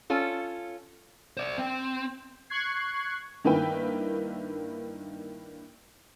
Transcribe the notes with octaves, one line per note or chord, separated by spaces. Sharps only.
C#4 F4 A4
C5 D5
C4
C#6 F#6 G#6 C7
G2 D#3 A#3 E4 B4 G5